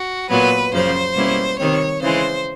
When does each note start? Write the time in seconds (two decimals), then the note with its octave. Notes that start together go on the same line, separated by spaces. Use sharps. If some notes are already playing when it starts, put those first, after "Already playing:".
Already playing: F#4
0.30 A#2 F#3 B3 B4
0.73 F#2 C#3 F3 C5
1.16 B2 G3 A#3 C#4 E4
1.58 C3 D#3 G3 C4 C#5
2.01 C#3 E3 G#3 C5